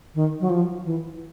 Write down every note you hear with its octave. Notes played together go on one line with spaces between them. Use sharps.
D#3
F#3
F3
E3